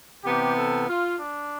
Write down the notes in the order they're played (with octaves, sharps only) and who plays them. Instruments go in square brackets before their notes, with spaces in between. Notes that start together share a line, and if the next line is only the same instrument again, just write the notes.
[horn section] C3 E3 B3 G4
A4
F4
D4